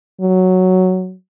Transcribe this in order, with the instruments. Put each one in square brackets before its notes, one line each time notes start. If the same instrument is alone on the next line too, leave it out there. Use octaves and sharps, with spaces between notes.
[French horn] F#3